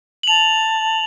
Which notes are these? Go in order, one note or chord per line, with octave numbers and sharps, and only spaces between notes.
F#7
A5 F7